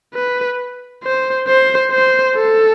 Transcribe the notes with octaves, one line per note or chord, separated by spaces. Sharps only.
B4
C5
C5
C5
A4